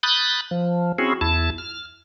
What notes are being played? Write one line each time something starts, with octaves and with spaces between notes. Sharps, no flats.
B5 D#6 F#6 G6 A6
F3
C4 C#4 E4 F#4 G#4
E2 E4 A5
F6